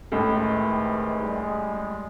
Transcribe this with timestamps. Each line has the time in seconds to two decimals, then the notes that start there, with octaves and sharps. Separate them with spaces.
0.12 C#2 A2 C3 D#3 E3
1.21 G3 G#3